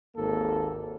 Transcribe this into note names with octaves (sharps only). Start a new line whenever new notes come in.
G#1 D#2 A#3 A4